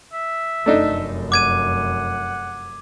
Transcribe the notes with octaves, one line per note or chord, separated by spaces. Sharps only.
E5
F1 F#2 A3 D4 D#4
F#5 D6 G#6 D#7